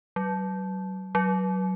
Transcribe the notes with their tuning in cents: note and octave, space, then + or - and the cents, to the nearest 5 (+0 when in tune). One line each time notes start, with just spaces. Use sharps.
F#3 +35
F#3 +15